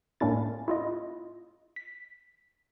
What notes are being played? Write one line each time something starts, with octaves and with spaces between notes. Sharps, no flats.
A2 A#3 C#4 D4 E4 A6
E4 F4 D#5
B6